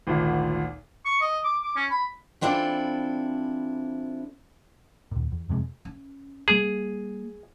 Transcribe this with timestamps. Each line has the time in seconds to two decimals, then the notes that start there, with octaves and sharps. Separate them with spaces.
0.07 G#1 D2 A#2
1.05 C#6
1.21 D#5
1.44 D6
1.63 D6
1.76 C#4
1.91 B5
2.41 E3 C4 D4 E4 F4 A4
5.11 D#2 A#2
5.32 E2
5.49 F2 C3 G#3
5.85 C#4
6.48 G3 A#3 G#4